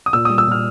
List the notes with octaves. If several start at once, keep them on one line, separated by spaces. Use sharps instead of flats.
D#6
A#2 E6
D#6
G3
E6
A#2 F6